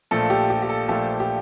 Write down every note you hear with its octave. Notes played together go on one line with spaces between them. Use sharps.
A#1 A#2 F3 A3 A4
G4
G4
G4
A4
A#1 A#2 F3 A3 G4
G4